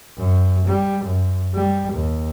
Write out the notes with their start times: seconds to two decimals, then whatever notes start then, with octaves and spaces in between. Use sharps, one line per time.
0.18 F#2
0.68 G3
1.04 F#2
1.54 G3
1.93 D#2